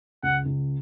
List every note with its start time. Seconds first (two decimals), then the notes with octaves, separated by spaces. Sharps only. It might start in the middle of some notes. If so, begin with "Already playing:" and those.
0.23 C#2 F#5
0.46 C#2